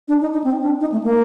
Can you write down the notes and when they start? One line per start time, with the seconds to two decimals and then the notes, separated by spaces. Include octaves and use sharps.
0.08 D4
0.21 D#4
0.33 D#4
0.44 C4
0.62 D4
0.80 D#4
0.92 A3
1.04 A#3